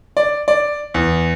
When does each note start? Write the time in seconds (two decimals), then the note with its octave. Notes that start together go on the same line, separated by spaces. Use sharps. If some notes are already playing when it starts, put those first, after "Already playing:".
0.17 D5
0.48 D5
0.94 E2